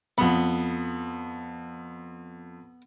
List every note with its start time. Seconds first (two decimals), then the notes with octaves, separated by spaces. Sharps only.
0.18 F2 B3 B5